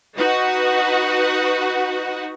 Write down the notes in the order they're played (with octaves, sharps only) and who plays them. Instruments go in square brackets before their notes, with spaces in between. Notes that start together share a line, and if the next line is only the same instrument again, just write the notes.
[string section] D#4 F#4 B4 F#5